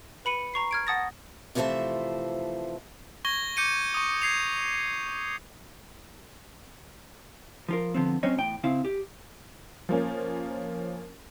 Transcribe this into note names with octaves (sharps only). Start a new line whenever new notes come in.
B4 B5 C#7 D#7
A#5 C#6 C7
F6 G#6 D7
F#5 A5 D#6 A6 A#6
C3 E3 F3 A3 C5 E5
C#6 G#6 A#6 G7
D6 G6 C#7 D#7 G7
C#6 D#6
G#6 C7 F7
F3 F4 A#4
D3 F3 B3 C4
F#3 C4 C#4 C5 C#5 D#5
E2 A2 G5
C#3 C4 E4 F5
G4
F3 A#3 C#4